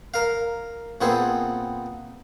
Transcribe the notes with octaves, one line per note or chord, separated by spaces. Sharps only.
A#4 F5
A#2 B3 C4 G#4 A4